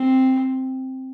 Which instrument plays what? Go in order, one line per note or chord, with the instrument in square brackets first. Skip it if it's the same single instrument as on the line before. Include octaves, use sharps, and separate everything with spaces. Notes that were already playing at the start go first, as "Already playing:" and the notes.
Already playing: [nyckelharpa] C4